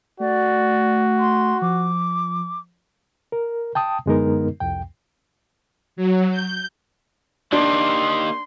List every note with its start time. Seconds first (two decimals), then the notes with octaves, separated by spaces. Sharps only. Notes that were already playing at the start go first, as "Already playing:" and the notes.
0.20 A3 F#4 D5
1.19 C6
1.62 F3 D6
3.32 A#4
3.75 G5 A5 D#6
4.06 F#2 D3 G#3 B3 D#4 A#4
4.60 C2 F2 G5
5.96 F#3
6.31 G6
7.52 A#3 D4 D#4 G4 C6